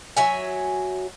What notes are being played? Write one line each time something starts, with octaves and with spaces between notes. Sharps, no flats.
F#3 E5 G#5